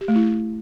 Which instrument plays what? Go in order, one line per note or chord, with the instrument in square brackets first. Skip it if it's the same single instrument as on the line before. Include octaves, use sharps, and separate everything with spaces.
[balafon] G4
A3
E4